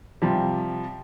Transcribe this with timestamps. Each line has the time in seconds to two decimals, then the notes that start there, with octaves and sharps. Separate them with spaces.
0.22 C3 F3 G3